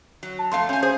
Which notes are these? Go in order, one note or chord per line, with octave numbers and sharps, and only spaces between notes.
F#3
A5
F2 A3 F5 C6
C#4 G#5 G6
G#4 C5